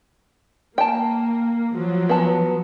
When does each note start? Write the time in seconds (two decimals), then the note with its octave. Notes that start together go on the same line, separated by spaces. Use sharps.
0.78 A#3 G5 A5
1.72 F3 F#3
2.09 B3 A5